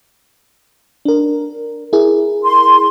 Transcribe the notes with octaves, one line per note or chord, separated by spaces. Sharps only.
D4 A#4
E4 G#4 A#4
C6